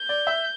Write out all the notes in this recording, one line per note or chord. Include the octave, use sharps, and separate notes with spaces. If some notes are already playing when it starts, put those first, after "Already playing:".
Already playing: G6
D5
E5